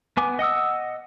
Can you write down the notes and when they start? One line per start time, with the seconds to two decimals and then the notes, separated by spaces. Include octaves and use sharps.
0.17 B3 G#5 D6
0.39 D#5 F#5 D#6 E6